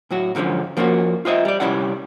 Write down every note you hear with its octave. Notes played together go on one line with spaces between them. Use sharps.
A2 F#3 F#4
G#2 D3 F3 F#3 C#4
F3 A#3 B3 C#4 F#4
F4 C5 D#5 E5
G3 D5
C2 G3 C#4 E4 C#5 F#5